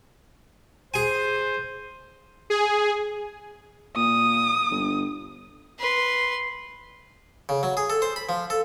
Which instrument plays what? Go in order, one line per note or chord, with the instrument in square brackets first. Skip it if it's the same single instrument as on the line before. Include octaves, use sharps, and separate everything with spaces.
[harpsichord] G#4 G#5 [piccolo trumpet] C5
[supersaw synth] G#4
[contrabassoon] A#2 [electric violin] D#6
[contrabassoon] G1
[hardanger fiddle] B4 C6
[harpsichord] C#3
F#3
G#4
A4
C5
B5
F3
A4